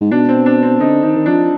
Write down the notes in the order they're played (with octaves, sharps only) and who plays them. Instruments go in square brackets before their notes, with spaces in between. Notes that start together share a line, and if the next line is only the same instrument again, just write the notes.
[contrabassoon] G#2
[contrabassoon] B2 [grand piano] D4
[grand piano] C4
D4
C4
[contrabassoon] D3 [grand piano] D#4
[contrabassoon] D#3 [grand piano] D#4
[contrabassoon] D#3
[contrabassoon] F3 [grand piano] D4